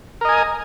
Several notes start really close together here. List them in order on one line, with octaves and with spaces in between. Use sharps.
A#4 D#5 G#5